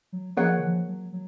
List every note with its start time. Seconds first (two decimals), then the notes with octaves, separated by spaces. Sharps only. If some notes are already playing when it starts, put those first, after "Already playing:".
0.13 F#3
0.37 F3 A#3 C#4 G#4 C#5 F#5
0.58 D#3
0.63 F3
0.88 F#3
1.13 F#3